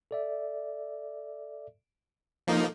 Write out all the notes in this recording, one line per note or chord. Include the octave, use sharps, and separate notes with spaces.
A4 D5 E5
F3 A#3 D#4 A4